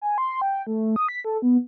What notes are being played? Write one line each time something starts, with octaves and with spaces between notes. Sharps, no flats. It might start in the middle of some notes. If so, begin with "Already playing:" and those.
G#5
C6
G5
A3
D#6
B6
A4
B3